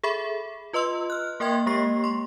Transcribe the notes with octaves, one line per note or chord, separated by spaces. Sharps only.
G#4 A4 E5 B5
F4 B4 D#5 C6 E6
F6 F#6
A#3 A#4 E5 G5 C6 G#6
G#3 A#3 G4 C#6 C7
C6 C#6